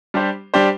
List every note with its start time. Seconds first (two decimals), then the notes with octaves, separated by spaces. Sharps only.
0.14 G3 D4 G4 C5
0.54 G3 D4 G4 C5